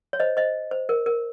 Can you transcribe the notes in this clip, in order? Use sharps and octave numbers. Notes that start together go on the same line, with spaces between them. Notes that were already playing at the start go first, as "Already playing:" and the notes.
C#5
C5 D#5
C5 D#5
C5
A#4
A#4